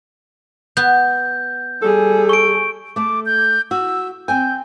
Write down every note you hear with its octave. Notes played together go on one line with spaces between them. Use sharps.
B3 G6
G3 G#4 A4
C#6 D7
A3 A4 D6
G6
F#4 E6
C4 G5 G#5 G6